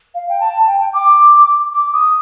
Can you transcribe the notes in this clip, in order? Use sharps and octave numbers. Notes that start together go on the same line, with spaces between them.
F5
G5
A5
G5
D6
D6
D#6